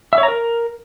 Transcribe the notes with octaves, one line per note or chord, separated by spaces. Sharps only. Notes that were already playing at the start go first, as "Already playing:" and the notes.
E5
C#5
A#5
A#4